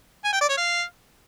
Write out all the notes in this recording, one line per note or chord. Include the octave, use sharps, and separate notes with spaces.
G#5
G5
D5
C#5
F5